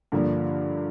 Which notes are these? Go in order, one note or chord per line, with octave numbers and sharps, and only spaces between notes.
G2 D3 F3 A#3 D4